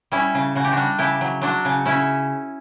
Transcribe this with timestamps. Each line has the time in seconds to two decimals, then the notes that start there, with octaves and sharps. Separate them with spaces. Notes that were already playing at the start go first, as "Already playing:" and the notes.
0.12 G3 C#4 E4
0.34 C#3
0.56 C#3 F#4
0.65 G4
0.72 G3 D4 F#4
0.99 C#3 E4 G4
1.21 F#3
1.42 F#3 D4 F#4
1.65 C#3
1.86 C#3 C#4 E4